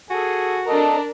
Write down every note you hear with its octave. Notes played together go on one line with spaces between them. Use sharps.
F#4 G#4 A4 G#5
D4 A4 A#4 D#5 A5